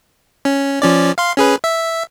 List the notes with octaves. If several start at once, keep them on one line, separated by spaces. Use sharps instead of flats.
C#4
F3 C#4 D5
F5 C6
C#4 G#4 B4
E5